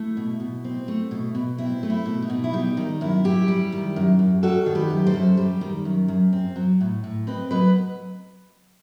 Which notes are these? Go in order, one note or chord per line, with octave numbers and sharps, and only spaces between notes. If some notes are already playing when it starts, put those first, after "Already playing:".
Already playing: A3 E4
B2
B2
C4
A3
B2
B2
C4 E4
A3
E4
B2
D#4
B2
E4
G3 D#4
D#3 D#4
F#2 E4
F#2 E4 G4
G3
D#3
F#2
F#2
G3 F#4 A4
D#3
G4 B4
F#2
A4 C5
F#2
G3
D#3
F#2
F#2
C4
F#3
A2
A2
C4 B4 D#5
F#3 B4 D#5